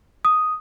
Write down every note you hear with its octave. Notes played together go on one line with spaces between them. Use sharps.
D#6